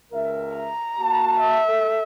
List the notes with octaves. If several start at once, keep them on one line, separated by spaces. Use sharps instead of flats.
C#2 A#4 E5
A#5
A#3 F#4 A5
E5
A4